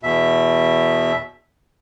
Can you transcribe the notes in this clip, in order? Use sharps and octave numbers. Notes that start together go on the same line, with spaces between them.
E2 B2 E5